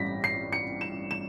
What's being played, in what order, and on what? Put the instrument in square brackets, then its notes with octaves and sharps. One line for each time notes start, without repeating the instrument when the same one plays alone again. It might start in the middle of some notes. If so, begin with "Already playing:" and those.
Already playing: [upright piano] A1 G2 G3 A#6 B6
C7
C#7
E7
E7